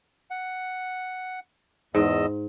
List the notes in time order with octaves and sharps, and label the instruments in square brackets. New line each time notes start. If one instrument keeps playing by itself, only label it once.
[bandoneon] F#5
[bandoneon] E2 D#5 E6 [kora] G#2